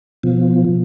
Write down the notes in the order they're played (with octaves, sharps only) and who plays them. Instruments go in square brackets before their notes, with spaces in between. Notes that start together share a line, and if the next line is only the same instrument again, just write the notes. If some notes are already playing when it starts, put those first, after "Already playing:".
[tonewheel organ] B2 F3